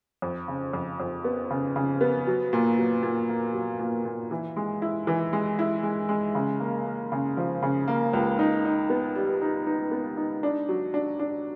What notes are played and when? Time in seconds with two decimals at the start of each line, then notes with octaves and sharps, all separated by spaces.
0.22 F2
0.48 C#3
0.73 F2
1.00 F2
1.24 B3
1.50 C#3
1.76 C#3
2.01 B3
2.27 F#3
2.53 A#2
2.78 F#3
3.03 A#2
3.29 A#3
3.54 F#3
3.79 A#2
4.05 A#2
4.31 E3
4.56 G#3
4.82 E4
5.07 E3
5.33 G#3
5.59 E4
5.83 G#3
6.09 G#3
6.35 C#3
6.60 A#3
6.86 A#3
7.12 C#3
7.37 F3
7.62 C#3
7.88 A#3
8.13 C#2
8.39 D#4
8.65 D#4
8.90 B3
9.15 G3
9.42 D#4
9.67 D#4
9.91 B3
10.17 D#4
10.43 D4
10.69 F#3
10.94 D4
11.19 D4